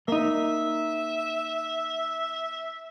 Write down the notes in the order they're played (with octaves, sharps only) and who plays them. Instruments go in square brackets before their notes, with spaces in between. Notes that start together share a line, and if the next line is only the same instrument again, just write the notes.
[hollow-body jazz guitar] A#3 D#4 [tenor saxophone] E5